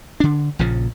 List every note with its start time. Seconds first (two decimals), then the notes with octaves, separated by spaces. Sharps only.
0.20 D3 D4
0.59 A#1 A#2 C#3 F3